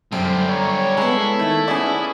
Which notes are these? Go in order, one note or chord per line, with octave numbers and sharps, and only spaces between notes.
F#2 D3 G3 C5
C#5 A#5
G#3 B3 E4 A4
D#3 A3
B3 C#4 G#4 D5